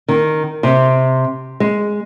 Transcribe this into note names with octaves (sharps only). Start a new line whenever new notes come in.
D#3
C3
G#3